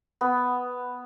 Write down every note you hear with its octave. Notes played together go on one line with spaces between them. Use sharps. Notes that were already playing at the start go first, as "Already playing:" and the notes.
B3